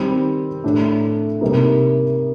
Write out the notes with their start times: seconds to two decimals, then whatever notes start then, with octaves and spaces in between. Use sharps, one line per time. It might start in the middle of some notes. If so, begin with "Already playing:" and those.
Already playing: D#3 G3 C4
0.64 A2 A3 D4
1.41 C3 G3 A#3 D#4